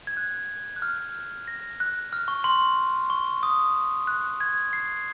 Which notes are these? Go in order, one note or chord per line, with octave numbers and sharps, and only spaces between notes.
G#6
F#6
F#6
F6
A#6
F#6
F6
C#6
C6
C#6
D#6
F#6
G#6
C7